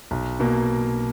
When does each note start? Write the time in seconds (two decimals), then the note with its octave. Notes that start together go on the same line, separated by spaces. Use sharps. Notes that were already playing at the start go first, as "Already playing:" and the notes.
0.11 B1
0.40 B2 A#3